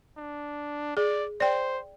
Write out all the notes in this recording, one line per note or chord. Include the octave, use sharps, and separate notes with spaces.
D4
G#4 D5
C5 D5 G5